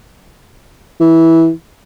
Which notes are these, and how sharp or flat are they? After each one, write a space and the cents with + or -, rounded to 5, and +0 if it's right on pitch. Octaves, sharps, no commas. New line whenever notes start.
E3 -10